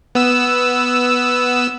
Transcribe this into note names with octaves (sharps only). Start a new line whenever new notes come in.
B3 E6